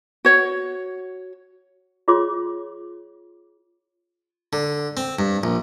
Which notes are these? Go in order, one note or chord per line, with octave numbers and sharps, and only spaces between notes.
F#4 C#5
F4 G#4 C#5 C6 D6
D3
C4
G2
A#1